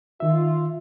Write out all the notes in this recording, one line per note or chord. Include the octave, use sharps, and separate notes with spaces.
D#3 F4 E5